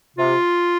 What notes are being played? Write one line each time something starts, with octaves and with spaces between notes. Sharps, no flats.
C3 F4